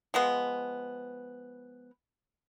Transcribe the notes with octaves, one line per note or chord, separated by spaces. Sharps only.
F3 G#3 B3